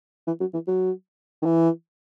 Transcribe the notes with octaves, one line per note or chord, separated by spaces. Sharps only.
E3
F#3
E3
F#3
D#3
E3